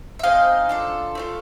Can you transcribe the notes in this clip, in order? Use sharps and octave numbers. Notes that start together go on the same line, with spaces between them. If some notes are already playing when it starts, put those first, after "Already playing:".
E5
C4 D#4 G#4 D#5 F5
D4 F4 A4
A3 D4 F4